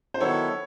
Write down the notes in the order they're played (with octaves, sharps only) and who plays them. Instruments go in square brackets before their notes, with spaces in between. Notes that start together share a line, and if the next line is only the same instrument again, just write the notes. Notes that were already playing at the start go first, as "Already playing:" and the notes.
[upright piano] C5
[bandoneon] D#3 F#3 B3 E4 A4 [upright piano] C#5